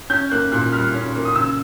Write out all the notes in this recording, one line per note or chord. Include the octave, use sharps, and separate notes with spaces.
C#4 G6
A#3 F#6
A#2 F#6
G3 F6
C#4
A#3
D#6
C#3 E6